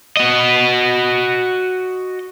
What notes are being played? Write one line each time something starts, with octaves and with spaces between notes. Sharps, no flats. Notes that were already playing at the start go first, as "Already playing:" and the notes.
F#4 D#5